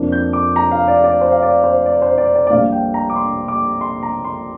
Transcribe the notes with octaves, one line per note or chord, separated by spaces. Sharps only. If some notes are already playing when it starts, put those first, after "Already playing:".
Already playing: F2 F3 A#3 D4
G6
D6
A#5
F5
D5
D5
C5
F5
D5
C5
D5
C5
D5
D5
D5
A#1 A#2 G3 F5
G5
A#5
D6
C6
D6
C6
A#5
C6